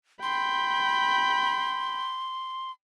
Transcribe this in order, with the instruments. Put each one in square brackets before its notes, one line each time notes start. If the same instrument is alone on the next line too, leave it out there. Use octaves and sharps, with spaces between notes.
[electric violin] G5 B5 [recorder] C6